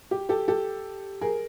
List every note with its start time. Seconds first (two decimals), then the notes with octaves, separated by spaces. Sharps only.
0.11 G4
0.29 G4 A4
0.48 G4 A4
1.21 G#4 A#4